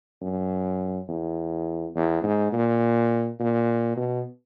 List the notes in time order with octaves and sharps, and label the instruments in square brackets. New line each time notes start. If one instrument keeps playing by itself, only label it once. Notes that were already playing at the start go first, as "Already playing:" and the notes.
[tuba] F#2
E2
E2
G#2
A#2
A#2
B2